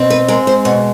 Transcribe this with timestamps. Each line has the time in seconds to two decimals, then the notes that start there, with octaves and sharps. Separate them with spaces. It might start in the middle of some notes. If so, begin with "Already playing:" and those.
Already playing: B2 C4
0.10 B4
0.28 G#3 A#4
0.47 C5
0.65 B2 C#5